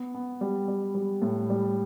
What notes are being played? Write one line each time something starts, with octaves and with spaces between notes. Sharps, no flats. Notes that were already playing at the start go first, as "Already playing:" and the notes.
Already playing: B3
B3
G3
G3
G3
A2
G3